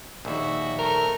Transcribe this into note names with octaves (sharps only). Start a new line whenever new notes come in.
A#1 D#2 F#4 E5
A3 A#4